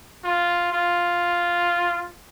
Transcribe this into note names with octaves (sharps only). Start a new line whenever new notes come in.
F4
F4